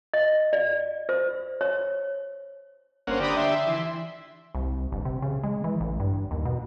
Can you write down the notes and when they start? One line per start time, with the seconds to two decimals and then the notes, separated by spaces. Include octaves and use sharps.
0.14 D#5
0.53 D5
1.09 C5
1.61 C#5
3.07 G1 A#3 C#4 C5 F#5
3.20 D3 G4 D5 A#5 B5 D#6
3.36 E5 C6
3.67 E3
4.55 C2
4.92 G1
5.05 C3
5.22 C#3
5.43 G#3
5.64 E3
5.81 A1
6.00 G2
6.31 D#2
6.45 B2